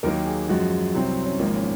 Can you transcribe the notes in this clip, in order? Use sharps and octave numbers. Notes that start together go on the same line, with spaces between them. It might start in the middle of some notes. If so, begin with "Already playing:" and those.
D#2 D#3 F#3 A#3 A#4
G#4
F#2 F3 G#3 F#4
C2 C3 F#3 C4
C#4
G#1 G#2 F3 A#3 D#4
C#4